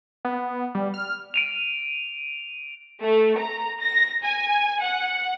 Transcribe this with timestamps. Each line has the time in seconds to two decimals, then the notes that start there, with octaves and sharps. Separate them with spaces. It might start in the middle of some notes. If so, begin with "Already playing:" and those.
0.25 B3
0.75 G3
0.94 F6
1.34 D7 D#7 F7
3.02 A3
3.37 A#5
3.80 A#6
4.23 G#5
4.81 F#5